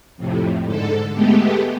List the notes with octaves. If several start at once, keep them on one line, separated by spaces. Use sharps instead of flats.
F2 A2 C3
G#2 D3 A4
G#3 A3 B3 G4